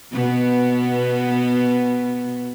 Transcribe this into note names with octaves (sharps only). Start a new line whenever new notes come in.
B2 B3